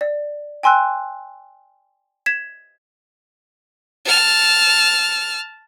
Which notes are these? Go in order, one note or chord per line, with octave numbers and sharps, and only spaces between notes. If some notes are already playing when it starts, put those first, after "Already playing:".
D5
G5 G#5 C6 E6 F#6
G#6 B6 E7
A5 F6